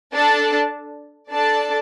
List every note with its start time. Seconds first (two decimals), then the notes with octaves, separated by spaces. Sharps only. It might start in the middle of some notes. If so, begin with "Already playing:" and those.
0.13 D4 A4 D5 A5
1.31 D4 A4 D5 A5